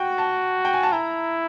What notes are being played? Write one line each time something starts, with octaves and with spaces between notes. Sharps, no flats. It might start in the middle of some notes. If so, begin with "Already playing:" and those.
Already playing: F#4 G5
A5
G5
G#5
A5
E4 A#5